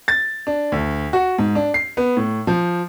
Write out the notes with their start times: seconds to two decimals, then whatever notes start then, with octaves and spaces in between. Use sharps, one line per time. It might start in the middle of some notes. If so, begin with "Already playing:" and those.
0.08 A6
0.47 D4
0.72 D2
1.13 F#4
1.38 G#2
1.55 D4
1.74 C7
1.97 B3
2.17 A2
2.47 F3